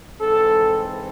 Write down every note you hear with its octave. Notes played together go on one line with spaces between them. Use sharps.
G#2 E3 C4 A4